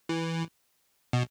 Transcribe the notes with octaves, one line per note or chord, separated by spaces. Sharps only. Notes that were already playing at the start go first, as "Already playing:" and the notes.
E3
B2